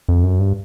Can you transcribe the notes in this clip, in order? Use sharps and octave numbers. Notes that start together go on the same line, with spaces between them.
F2
F#2
G2